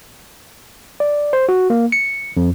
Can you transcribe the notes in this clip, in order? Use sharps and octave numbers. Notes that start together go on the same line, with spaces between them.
D5
C5
F#4
A#3
C#7
F2